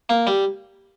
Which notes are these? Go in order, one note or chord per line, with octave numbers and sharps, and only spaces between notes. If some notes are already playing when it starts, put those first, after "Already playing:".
A#3
G3